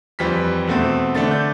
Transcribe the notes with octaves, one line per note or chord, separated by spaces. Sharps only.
F2 E3 G3 B6
E2 B2 A3 C4
D3 A3 D4 A6
G6